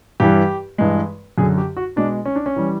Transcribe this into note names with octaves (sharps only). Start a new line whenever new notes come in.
G2 E3 G3 G4
G2 E3 G#3
F#2 D3 F#3 G#4
G4
F#4
B2 G#3 D4
C#4
D4
C#4
E3 G3